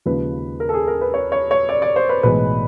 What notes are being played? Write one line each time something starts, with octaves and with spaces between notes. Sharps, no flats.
D#2 C#3 F3 G#3 B4
A#4
A4
G#4
A#4
B4
C#5
C#5
C#5
D5
D5
C5
B4
B1 A2 E3 G#3 B4